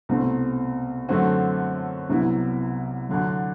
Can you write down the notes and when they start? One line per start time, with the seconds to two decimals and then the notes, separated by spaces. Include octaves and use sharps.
0.09 C2 B2 A3 C4
1.09 F#2 D3 A3 C4 F#4
2.09 C2 C3 F#3 B3 E4
3.09 D2 D3 F#3